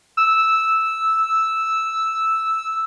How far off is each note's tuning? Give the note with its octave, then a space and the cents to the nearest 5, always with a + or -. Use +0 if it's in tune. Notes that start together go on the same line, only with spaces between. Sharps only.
E6 -5